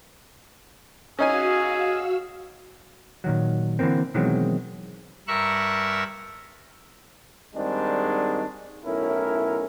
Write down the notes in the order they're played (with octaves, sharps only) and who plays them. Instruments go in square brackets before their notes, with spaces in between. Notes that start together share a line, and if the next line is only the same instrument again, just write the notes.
[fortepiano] C#4 D#4 G#5 [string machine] F#4 F5 E6 [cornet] G#4
[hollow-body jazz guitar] A#2 D#3 F#3
D3 E3 G3 A#3 C4
B2 D#3 E3 F#3 G#3 C4
[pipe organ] G2 A#4 E5 C#6 E6 F#6
[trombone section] G#2 D#3 G3 G#3 C4 D4
B1 A2 C#4 E4 A#4